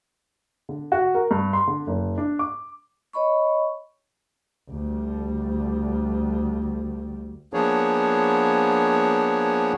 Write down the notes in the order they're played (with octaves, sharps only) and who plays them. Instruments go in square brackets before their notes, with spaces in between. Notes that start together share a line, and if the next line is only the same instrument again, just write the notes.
[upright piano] D3
F#4
A#4
G2
C6
D3
F#1
D4
D6
[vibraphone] C#5 D#5 B5 C#6
[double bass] D2 G3
[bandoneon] F3 A#3 B3 D4 G#4 C#5